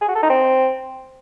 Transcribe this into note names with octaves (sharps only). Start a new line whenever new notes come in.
G#4
F#4
A4
D#4
C4